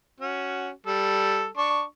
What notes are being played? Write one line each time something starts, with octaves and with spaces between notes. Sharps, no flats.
C#4 F#4
G3 A4
D4 C#6